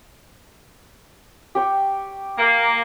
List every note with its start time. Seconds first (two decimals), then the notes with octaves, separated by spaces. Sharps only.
1.55 G4 G5 C#6
2.38 A#3